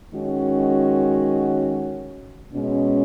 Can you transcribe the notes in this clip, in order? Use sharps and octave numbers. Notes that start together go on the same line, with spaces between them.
D#3 G#3 C#4 F#4
B2 G#3 C#4